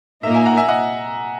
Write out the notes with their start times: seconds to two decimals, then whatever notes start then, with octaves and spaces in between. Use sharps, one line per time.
0.23 A#2 A#3 D#4 A#4 E5
0.34 E5 G#5
0.46 F#5 A#5
0.57 E5 G#5
0.68 D#5 F#5